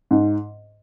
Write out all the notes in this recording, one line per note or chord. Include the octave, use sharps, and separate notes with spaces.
G#2